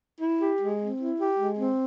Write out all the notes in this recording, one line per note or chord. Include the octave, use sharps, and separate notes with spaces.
E4
G4
G#3
C4
E4
G4
G#3
C4